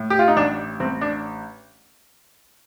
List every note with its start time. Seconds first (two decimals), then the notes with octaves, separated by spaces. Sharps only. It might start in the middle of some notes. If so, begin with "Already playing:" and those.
Already playing: A2
0.10 G4
0.19 F4
0.28 D#4
0.36 A1 D4
0.80 A1 C4
1.01 D4